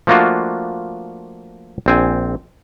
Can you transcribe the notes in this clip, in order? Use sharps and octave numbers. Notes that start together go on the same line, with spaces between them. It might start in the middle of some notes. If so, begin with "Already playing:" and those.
F3 A3 A#3 D4 F4 F#4
A#1 C4 G#5